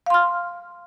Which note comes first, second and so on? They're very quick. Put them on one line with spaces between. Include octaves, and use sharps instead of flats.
F5 C6 F6